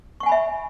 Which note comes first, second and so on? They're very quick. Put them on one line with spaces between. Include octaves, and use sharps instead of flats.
C#6 F#5 G#5 B5 E5